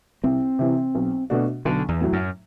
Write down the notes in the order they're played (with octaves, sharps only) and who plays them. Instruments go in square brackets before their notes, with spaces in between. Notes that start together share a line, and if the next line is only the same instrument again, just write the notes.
[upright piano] C2 [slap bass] C4
[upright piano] C3 E3
B1
B2 A3 D4 F#4
[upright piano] B1 [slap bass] D3
[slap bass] E2
[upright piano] A2 F#3
[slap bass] F#2